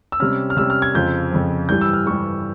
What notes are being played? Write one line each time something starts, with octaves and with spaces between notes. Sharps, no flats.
E6
C3 G3 C#4 F6
F6
C3 G3 C#4 E6
F6
G#6
F2 C#3 F3 G6
F2 C#3 F3
G2 E3 G3 G6
E6
F6
G2 E3 G3 C#6